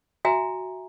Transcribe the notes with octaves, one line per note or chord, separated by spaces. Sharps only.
F#4 E5 G#5 A#5